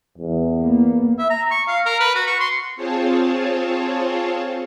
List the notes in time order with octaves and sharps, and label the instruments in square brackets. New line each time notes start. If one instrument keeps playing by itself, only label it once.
[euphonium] E2
[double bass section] A#3 B3
[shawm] E5
A#5
C#6
F5
A#4
B4
F#4
C#6
C6
[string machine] C4 F4 G#4 C5 C#5 A5